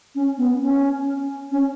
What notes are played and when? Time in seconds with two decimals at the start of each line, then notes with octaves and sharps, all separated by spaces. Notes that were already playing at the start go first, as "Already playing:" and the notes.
0.15 C#4
0.38 B3
0.61 C#4
1.52 C#4